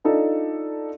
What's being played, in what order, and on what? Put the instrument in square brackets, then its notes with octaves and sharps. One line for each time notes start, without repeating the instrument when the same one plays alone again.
[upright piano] D4 D#4 F4 A4